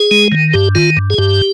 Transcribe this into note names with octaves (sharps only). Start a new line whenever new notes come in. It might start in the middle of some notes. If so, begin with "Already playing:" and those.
Already playing: G#4
G#3
D#3
G2 G4
D#3 F4
G2
G#4
G2 G4